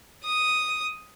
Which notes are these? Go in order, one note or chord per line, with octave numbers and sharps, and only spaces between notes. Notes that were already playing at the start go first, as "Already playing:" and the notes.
D#6